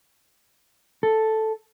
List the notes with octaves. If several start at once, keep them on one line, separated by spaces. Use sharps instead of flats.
A4